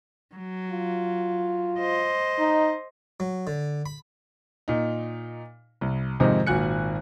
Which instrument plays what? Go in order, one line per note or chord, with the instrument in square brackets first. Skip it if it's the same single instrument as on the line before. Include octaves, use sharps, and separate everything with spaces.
[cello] F#3
[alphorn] F4
[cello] C5 D#5
[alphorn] D#4
[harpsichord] F#3
D3
B5
[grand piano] A#2 D#4
C2
F2 G#2 C3 D#3 F3 G#3
G#1 A#2 F#4 G#5 F#6 C#7